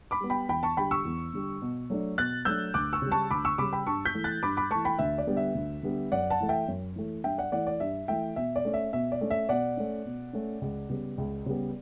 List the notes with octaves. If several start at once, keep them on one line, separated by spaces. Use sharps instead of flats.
B5 D6
G3 B3
G5 B5
E2 G5 B5
A5 C#6
D3 G3 G5 B5
C#6 E6
E2
D3 G3
B2
F#3 A3 D4
B2 F#6 A6
F#3 A3 D4 E6 G6
D2 D6 F#6
C#6 E6
C#3 G3
A5 C#6
D2 B5 D6
C#6 E6
C#3 G3 B5 D6
G5 B5
G2 A5 C#6
G6 B6
E3 A3
F#6 A6
G2 B5 D6
B5 D6
E3 A3 A5 C#6
G5 B5
D2 E5
D5
D3 G3 B3
E5
D2
D3 G3 B3
F#2 D5 F#5
F#5 A5
E3 A3
E5 G5
F#2
E3 A3
G2 E5 G5
D5 F#5
E3 A3 D5 F#5
D5
G2 E5
E3 A3 E5 G5
B2 E5
D5
A3 C#4
E5
B2 E5
D5
A3 C#4
E5
B2 D5 F#5
A3 C#4
B2
A3 C#4
C#2
C#3 G3 B3
C#2
C#3 G3 B3